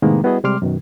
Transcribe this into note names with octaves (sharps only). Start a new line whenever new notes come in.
A2 C3 D#3 G#3 A#3 B3
G3 B3 E4 F#4 G#4 D#5
C3 G3 G#3 C6 D6 F6
F#2 B2 D#3